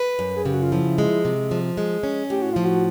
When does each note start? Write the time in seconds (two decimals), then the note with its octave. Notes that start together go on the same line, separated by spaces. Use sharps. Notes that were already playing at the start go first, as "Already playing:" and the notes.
Already playing: B4
0.19 F#2
0.36 G#4
0.45 C#3 G4
0.54 F#4
0.62 F4
0.72 F3 E4
0.98 G#3
1.25 C3
1.51 F3
1.77 G#3
2.03 C#4
2.30 A2 G4
2.42 F#4
2.53 F3 F4
2.65 F#4